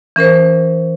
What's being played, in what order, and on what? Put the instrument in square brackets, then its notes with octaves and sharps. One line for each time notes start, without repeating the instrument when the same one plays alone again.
[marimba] E3 C#4 A#4 C5